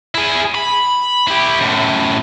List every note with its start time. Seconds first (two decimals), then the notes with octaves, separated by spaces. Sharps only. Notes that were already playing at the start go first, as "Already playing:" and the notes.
0.15 E4 G#4
0.54 B5
1.27 E4 G4
1.61 F#2 A2